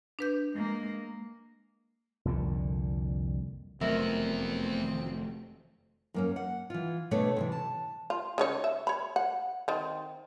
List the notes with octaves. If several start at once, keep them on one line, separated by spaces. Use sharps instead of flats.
D4 B4 G6
G#3 A#3
C2 F2 A#2 D3
F1 E2 F#3 A3 B3 C4 A#4 E5
F#2 A#3 C#4
F#5
E3 F4
B2 A3 D4 A4 C#5
C3 D#3 E3
A5
F4
C#3 D#4 C#5
E5
C#5 B5
F#5
D#3 C4